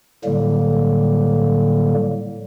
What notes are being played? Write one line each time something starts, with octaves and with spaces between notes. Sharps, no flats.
A2 D3 F#3 G3 A#3